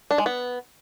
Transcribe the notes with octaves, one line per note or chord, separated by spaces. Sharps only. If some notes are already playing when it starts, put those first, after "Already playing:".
D4
G#3
B3